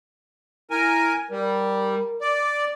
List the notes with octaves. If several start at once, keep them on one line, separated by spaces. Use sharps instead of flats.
E4 A#4 G#5
G3 A#4
D5